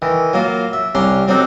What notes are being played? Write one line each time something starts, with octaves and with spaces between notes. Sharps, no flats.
D#3 E3
F#3 A#3 F4
E5
C2 C#4 D4 A#5 C6
F#3 C4 D4 D#4 A4